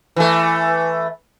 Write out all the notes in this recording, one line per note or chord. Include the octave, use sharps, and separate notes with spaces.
E3 A3